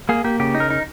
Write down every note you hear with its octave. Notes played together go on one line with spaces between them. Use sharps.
A#3 G#4
A#3 G4
C#3 G4
D#4
A#4
D#4